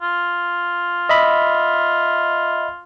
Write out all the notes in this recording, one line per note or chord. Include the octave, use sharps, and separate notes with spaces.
F4
D#5 E5 B5